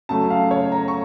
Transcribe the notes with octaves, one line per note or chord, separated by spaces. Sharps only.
C#3 F#3 A3 A5
F5
C#5
A#5
C#6